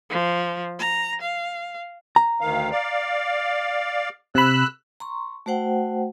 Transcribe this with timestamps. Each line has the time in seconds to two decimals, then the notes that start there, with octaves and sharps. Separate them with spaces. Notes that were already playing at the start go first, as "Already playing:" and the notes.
0.10 F3
0.79 A#5
1.21 F5
2.16 A#5
2.41 D2 D#3 F5
2.71 D5 F5
4.35 C3 B5 E6 F#6
5.00 A#5 C6 C#6
5.46 A3 F#4 C5 F#5 G5